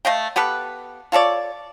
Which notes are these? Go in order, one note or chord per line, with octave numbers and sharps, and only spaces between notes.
A3 D#5 F5 G5
B3 G4 A4 B4
F4 A4 C#5 D5